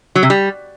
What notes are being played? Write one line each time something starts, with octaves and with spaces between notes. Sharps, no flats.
F#3
C3
G3